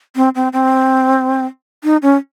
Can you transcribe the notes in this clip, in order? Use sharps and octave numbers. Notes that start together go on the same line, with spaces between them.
C4
C4
C4
D#4
C#4